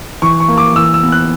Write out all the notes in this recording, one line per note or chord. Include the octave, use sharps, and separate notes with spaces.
E3 C#6
C#6
A#3
D6
E3 E6
E6
B3
F#6